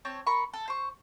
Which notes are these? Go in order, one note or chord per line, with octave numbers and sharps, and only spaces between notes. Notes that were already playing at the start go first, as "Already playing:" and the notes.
C4 C#5 A5
A#4 B5 C#6
A4
C5 C#6